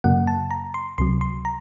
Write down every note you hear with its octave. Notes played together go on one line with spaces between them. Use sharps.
F#2 C#3 F#3 A#3 F#5
A5
A#5
C6
C#2 C3 F#3 C6
C6
A#5